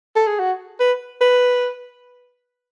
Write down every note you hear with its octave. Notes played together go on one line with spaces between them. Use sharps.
A4
G#4
F#4
B4
B4